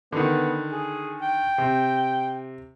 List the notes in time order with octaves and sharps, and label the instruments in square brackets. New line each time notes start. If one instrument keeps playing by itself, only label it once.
[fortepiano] D3 D#3 [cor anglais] B3
[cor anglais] G#4
G5
[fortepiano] C3